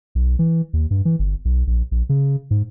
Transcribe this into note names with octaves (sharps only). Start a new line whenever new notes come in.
B1
E3
D#2
G2
E3
G1
B1
A#1
A#1
C#3
G#2